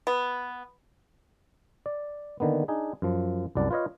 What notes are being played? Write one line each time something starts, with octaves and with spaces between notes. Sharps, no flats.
B3
D5
D3 D#3 A#3 B3
D4 D#4 G#4
F#2 F3
C2 F#2 D5 F#5 A5
F4 B4 C#5 D#5 F5